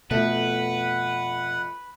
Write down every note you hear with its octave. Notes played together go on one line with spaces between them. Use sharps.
F2 B2 A3 B3 B4 F#5